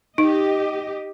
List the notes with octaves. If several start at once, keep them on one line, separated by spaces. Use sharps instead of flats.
D#4 G4 D#5